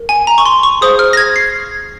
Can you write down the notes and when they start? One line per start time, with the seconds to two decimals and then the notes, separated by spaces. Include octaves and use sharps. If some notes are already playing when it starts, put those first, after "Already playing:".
Already playing: A#4
0.09 G#5
0.27 A#5
0.38 C#6
0.46 C6
0.63 C#6
0.81 G#4 C5 F5 D#6
0.99 F6
1.13 A#6
1.17 G#6
1.36 C7